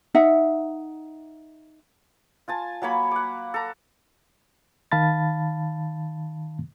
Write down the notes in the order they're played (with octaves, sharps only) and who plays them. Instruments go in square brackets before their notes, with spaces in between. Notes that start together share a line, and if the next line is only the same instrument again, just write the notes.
[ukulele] D#4 E5 F#5
[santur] F4 G#5 A5
F#3 A#3 C#5 B5
F#5 D6
A4 A#5
[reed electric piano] D#3 F5 A5 B5 A6